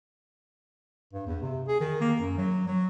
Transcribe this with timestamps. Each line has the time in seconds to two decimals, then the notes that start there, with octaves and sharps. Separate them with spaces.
1.13 G2
1.27 E2
1.42 C3
1.68 G#4
1.81 D#3
2.01 A#3
2.19 F#2
2.38 F#3
2.67 F#3